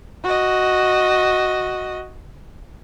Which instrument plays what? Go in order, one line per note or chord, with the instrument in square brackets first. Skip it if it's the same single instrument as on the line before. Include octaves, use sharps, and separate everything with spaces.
[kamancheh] F#4 D#5